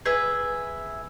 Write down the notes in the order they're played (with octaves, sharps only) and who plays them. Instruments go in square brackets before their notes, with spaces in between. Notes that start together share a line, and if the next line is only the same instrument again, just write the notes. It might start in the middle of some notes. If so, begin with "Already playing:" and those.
[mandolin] G#4 B4 E5